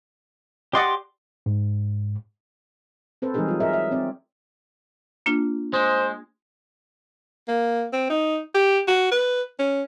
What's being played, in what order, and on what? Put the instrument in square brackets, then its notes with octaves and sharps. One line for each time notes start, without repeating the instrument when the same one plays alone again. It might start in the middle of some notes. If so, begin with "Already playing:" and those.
[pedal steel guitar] G4 C6 D6 [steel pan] D5 D#5 F#5
[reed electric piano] G#2
[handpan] C4 A4 B4 C5
E3 G3 G#3 D#4 G#4 A#4
F#3 F4
G#4 A#4 D#5 E5
E5
C4 D5
[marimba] A#3 D4 F4
[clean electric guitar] G#3 [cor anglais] C5
[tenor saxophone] A#3
C4
D#4
G4
F#4
B4
C#4